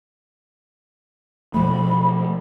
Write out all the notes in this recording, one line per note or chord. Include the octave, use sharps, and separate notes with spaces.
B2 F3 A3 B5